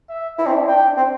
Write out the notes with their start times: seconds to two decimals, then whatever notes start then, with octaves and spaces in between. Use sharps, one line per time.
0.09 E5
0.38 E4
0.46 C4
0.53 D4
0.67 D4 G5
0.97 C4